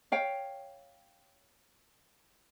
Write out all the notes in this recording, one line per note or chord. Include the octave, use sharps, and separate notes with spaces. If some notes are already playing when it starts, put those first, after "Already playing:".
C#5 F5 G5